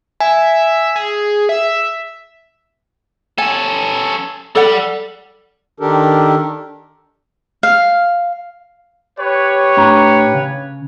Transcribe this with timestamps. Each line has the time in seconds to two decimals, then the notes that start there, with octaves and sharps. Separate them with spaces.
0.20 E5 G#5
0.96 G#4
1.49 E5
3.38 C#4 A4 G#5
4.55 G3 A4 D5 F#5
5.80 D#3 D4 G4 A4 A#4
7.63 F5
9.19 G4 B4 C#5
9.77 A2 D4 A#5
10.34 C#3